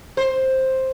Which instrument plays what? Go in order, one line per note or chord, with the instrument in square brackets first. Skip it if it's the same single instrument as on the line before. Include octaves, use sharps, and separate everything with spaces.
[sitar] C5